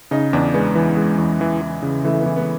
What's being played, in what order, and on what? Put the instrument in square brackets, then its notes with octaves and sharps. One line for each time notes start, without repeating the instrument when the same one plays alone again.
[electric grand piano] C#3 [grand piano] D#4
[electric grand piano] E2 [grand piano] D4
[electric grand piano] G#3 [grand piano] B3
[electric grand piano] E3
G#3
E2
E3
E3
C#3
[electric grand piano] E3 [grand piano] A3
[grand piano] B3
[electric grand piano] E3
[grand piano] B3